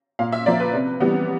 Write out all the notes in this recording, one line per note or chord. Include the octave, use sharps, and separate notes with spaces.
A#2 F5
E5
F3 A#3 D5
B4
C3
E3 G3 B3